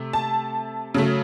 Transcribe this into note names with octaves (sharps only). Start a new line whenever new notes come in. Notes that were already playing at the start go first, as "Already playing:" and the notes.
Already playing: C3 A3
A5
C#3 F#3 A3